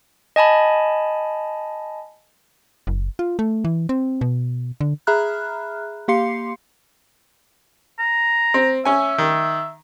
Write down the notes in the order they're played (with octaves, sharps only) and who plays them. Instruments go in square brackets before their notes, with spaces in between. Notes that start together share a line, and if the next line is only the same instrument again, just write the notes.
[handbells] D#5 G#5 A5 B5
[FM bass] F#1
F4
A3
E3
C4
B2
D3
[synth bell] G#4 E5 A#5 B5 F6 F#6
A#3 G4 F5 C6 C7 C#7
[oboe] A#5
[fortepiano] C4
[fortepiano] C#4 G#5 [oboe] E5
[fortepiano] D#3